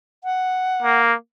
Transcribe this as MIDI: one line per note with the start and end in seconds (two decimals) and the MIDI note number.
0.24 1.01 78
0.83 1.13 58